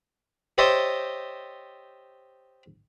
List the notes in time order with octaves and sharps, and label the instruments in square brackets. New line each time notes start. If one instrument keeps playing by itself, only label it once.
[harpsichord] G4 C5 C#5 D#5 E5 A5